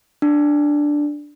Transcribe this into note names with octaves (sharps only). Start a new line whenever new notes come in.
D4